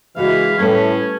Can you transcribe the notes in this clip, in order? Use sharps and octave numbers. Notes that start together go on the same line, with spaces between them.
C#3 E3 G#3 F#4 E5 F5
A2 G3 A3 C#4 B4